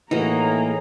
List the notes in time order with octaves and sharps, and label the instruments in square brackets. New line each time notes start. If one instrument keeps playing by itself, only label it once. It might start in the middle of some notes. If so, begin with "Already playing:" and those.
[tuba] A2 [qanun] E3 F#4 [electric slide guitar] A#3 D#4 [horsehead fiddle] G#4 A#5